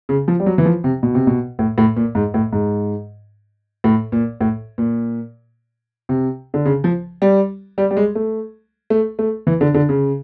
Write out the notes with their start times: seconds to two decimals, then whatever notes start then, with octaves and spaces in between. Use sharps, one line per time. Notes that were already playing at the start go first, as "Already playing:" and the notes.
0.09 C#3
0.28 F3
0.40 G3
0.46 F#3
0.58 E3
0.65 F3
0.84 C3
1.03 B2
1.15 C3
1.27 B2
1.59 A2
1.78 A2
1.96 A#2
2.15 G#2
2.34 A2
2.53 G#2
3.84 A2
4.12 A#2
4.41 A2
4.78 A#2
6.09 C3
6.54 D3
6.65 C#3
6.84 F3
7.22 G3
7.78 G3
7.91 G3
7.97 G#3
8.15 A3
8.90 A3
9.19 A3
9.47 E3
9.61 D3
9.74 D3
9.89 C#3